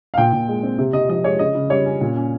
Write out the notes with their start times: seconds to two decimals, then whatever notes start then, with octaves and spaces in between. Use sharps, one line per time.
0.14 F5
0.17 A#2 G5
0.33 A#2
0.48 G#3
0.63 C4
0.78 C3
0.93 C3 D#5
1.09 F3 D#5
1.24 G#3 C#5
1.39 C#3 D#5
1.55 C#3
1.70 G3 C#5
1.86 C#4
2.01 A#2
2.16 C#4